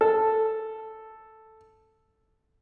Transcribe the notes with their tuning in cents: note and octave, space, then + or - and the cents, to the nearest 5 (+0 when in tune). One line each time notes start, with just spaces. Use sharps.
A4 +0